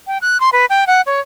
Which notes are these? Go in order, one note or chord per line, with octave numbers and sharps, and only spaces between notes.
G5
F#6
C6
B4
G5
F#5
C#5